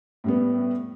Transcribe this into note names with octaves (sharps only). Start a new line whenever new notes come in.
A2 G3 B3